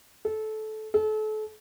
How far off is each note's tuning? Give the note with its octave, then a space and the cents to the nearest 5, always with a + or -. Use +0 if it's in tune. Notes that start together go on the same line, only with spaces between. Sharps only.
A4 -20
A4 -35